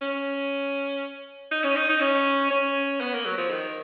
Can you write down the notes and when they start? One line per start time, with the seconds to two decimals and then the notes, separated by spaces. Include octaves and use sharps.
0.01 C#4
1.51 D#4
1.64 C#4
1.76 D#4
1.89 D#4
2.01 C#4
2.51 C#4
3.01 B3
3.13 A#3
3.26 F#3
3.38 F3
3.50 D#3